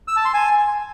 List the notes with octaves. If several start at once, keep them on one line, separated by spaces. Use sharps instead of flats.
E6
A5
C6
G#5